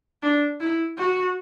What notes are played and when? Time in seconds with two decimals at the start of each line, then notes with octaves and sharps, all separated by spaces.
0.23 D4
0.60 E4
0.98 F#4